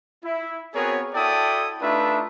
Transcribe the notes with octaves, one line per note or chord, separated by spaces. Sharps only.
E4
B3 C4 F#4 G#4 A#4 C#5
E4 F#4 A4 D5 G5 D#6
A3 D4 D#4 F4 B4 E5